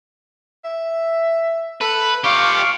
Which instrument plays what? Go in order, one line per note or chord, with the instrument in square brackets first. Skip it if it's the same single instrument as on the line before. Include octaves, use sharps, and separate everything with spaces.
[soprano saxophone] E5
[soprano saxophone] A4 [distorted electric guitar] B4
[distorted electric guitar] F4 G4 [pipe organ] F5 C#6 [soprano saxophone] D6